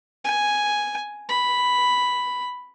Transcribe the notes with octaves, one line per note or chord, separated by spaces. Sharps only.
G#5
B5